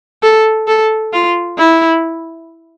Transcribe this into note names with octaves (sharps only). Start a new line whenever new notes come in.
A4
A4
F4
E4